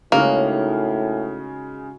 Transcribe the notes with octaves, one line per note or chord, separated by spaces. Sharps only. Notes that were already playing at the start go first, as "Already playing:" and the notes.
A2 C#3 G#3 A#3 C#4 D#4 F#4 F6